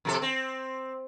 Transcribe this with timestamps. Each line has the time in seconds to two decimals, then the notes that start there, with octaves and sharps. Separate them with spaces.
0.05 F2 C3 A4
0.22 C4